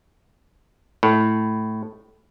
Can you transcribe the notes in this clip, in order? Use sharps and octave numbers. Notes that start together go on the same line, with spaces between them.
A2